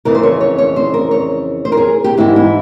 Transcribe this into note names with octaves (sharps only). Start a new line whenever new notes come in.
F2 C#3 E3 A#4
C5
C#5
C#5
C#5
C5
A#4
C#5
C5
A#4
G#4
G4
G#2 E3 E4
E4